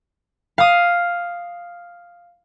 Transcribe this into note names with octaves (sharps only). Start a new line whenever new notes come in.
F5 D#6